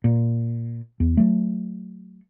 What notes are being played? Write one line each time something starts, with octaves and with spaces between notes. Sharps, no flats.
A#2
E2
F#3 A3